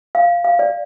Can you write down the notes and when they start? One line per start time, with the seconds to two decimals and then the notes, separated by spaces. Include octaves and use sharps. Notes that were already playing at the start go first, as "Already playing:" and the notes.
0.15 F5
0.45 F5
0.59 D5